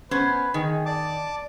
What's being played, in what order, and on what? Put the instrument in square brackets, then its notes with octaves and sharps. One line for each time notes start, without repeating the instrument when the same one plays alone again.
[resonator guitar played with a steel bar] B3 C#4 C5 [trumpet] B4
[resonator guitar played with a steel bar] D#3 [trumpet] G#4
[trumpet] D5 [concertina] A5 D6